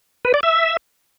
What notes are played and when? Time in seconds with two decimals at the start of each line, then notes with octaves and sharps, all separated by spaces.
0.25 B4
0.34 D5
0.43 E5